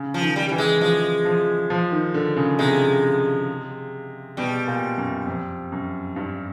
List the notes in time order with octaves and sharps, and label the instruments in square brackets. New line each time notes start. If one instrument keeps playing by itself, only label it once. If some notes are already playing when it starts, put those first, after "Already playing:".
Already playing: [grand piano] C#3
[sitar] F3
[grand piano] D#3
[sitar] G3
[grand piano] E3 [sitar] G3
[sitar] G#3
[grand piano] F3 [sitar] G#3
[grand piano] F3
F3
D#3
D3
C#3
[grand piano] C3 [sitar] G#3
[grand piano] B2 [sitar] G3
[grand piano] A#2
F#2
F2
F#2
G2